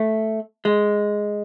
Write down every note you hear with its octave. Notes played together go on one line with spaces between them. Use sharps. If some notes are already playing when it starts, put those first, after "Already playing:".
Already playing: A3
G#3